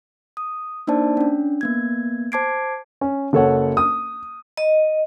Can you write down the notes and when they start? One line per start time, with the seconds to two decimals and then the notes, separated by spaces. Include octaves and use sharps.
0.37 D#6
0.87 A#3 D4 D#4 C5 D5 A5
1.17 C#4 D4
1.61 A#3 B3 G#6
2.32 C5 A5 D6 G#6 C7 D7
3.01 C#4
3.33 F#1 A4 C#5 F#5
3.77 D#6
4.57 D#5